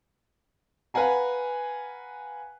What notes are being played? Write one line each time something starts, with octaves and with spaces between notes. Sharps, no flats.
B4 F5 F#5 G#5 A#5